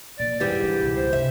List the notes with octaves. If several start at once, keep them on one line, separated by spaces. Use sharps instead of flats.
A#2 F3 D5
E1 F2 G#2 E3 G3 G4
D3
C#2 B2
C5
G2 C3 E5